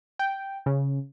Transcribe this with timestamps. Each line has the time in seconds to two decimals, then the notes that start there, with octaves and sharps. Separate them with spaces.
0.19 G5
0.66 C#3